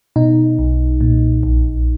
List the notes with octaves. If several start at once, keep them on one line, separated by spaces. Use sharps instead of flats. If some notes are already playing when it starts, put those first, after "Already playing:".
B2 D#4
B1
A#2
A#1